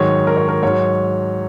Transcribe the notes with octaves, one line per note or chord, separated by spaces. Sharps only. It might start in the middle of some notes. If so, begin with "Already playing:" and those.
Already playing: G#2 D#3 F#3 C#5
A#4
C#5
A#4
G#2 F#3 C#5